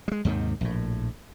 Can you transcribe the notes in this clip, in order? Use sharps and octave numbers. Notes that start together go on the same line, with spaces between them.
G3 G#3
D#2 G#2 C3 D#3
A#1 A2